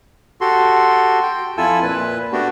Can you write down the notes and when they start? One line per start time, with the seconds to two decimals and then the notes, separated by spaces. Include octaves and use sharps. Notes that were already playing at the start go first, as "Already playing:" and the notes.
0.41 F#4 G4 A4 C6
1.23 G5
1.58 F2 E4 F4 A4 G#5 E6
1.83 A#2 B4
2.32 A3 B3 D4 F#4 G4